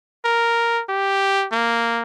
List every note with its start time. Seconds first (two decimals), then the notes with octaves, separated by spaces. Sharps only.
0.25 A#4
0.89 G4
1.52 A#3